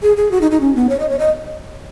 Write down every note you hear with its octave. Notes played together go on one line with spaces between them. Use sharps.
G#4
G#4
F#4
D#4
D#4
C#4
B3
C#5
D#5
C#5
D#5